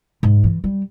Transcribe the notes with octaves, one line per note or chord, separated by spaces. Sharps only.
G#2
E3
G3